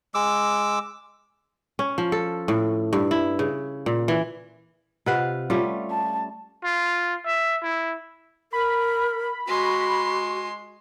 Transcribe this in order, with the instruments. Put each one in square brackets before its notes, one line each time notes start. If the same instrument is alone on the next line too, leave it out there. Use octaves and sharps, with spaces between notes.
[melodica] G#3 D6 E6
[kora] C#4
F3
A4
A2
G2
E4
C#3
A#2
E3
[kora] C3 B4 F5 [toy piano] F4 D#5 F#5
[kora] G3 A3 C#4 [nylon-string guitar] F4 [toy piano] D6
[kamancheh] A5
[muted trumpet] F4
E5
E4
[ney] A#4 [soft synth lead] B5
[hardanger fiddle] G#3 C6 [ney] F#4